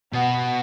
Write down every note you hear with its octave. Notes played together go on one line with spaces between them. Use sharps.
B2 B3